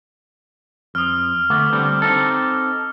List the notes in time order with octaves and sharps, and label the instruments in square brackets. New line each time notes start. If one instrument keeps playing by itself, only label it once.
[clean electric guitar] F2 [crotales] D#6 F6
[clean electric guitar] D2 A3 B3 [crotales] D6
[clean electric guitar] D3 G3 C4
C4 D#4 A4